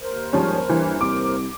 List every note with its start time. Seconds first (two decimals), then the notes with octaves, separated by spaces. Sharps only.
0.02 D#2 A#4 C5
0.33 G#2 F3 G3 C#4
0.69 G2 E3
1.01 C2 D6